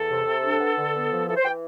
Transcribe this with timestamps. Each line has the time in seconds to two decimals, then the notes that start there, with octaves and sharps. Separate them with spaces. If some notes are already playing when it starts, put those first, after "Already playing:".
Already playing: E2 A4
0.10 C3
0.27 C3
0.43 D4
0.60 B3
0.77 D3
0.94 B3
1.11 F3
1.28 E3 A4
1.36 C5
1.44 E3 G5